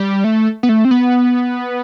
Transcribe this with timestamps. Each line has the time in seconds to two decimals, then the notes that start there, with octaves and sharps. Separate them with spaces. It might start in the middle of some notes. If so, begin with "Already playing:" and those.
Already playing: G3
0.24 A3
0.63 B3
0.69 A3
0.85 C4
0.91 B3